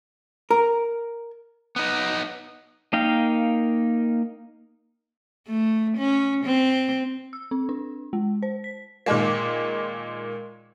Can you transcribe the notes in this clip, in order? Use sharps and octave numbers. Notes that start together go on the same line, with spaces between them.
A#4
B3 D#4
A#3 D#4 A#4 F5 G5
A3
C#4
C4
E6
C4
D4
G#3
C5
B6
A#2 D#3 G#3 A#3